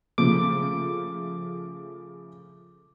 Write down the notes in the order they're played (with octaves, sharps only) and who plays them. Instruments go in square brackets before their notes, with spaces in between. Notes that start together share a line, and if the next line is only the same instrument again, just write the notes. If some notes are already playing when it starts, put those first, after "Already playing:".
[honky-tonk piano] C#3 F3 A3 [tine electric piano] D6